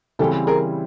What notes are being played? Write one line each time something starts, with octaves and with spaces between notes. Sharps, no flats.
C#3 E3 G3 C4 E4 G4 A4
G#4 A#4